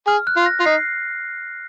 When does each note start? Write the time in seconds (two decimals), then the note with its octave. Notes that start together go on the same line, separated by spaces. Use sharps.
0.07 G#4 F6
0.27 F#6
0.36 F4
0.46 A#6
0.60 F4
0.65 D#4 C7